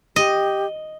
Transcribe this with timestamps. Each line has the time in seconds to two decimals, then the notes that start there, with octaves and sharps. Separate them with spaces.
0.16 G4 D#5